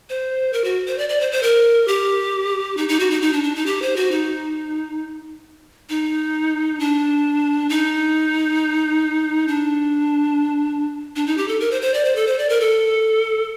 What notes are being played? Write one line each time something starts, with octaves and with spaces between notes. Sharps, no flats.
C5
A#4
F#4
C5
D5
D5
C5
C5
A#4
G4
D#4
D#4
F#4
D#4
D#4
D4
D4
D#4
G4
C5
F#4
D#4
D#4
D4
D#4
D4
D4
D#4
G4
A4
A#4
C5
C5
D5
C5
A4
C5
D5
A#4
A4